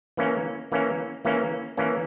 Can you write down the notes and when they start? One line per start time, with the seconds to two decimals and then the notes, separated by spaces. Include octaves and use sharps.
0.17 E3 A#3 C#4
0.72 E3 A#3 C#4
1.25 E3 A#3 C#4
1.77 E3 A#3 C#4